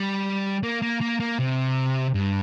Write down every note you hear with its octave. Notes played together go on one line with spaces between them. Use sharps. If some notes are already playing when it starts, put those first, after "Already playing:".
Already playing: G3
A#3
A#3
A#3
A#3
C3
G2